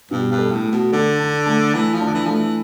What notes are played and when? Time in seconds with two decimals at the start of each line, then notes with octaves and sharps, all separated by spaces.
0.11 G2 B2
0.32 G2
0.38 A4
0.52 A2
0.65 A3
0.72 B2
0.92 D3 A4
1.20 D4
1.46 A3
1.73 E3 A3
1.94 F3
2.01 D4
2.08 D3
2.14 E3
2.26 F3 A3
2.34 E3